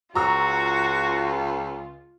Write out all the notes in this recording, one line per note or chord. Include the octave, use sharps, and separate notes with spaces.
C#2 F4 F#4 A#5 C#6 E6